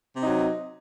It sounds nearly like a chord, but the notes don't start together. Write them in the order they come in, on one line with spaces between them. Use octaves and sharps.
C3 D#4 F#3